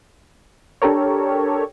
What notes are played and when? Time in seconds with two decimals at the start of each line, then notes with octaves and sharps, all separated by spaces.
0.82 D4 G4 A4 A#4 C#5